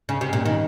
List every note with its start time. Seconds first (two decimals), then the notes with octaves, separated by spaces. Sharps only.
0.09 C#3
0.21 C3
0.33 A#2
0.46 D#3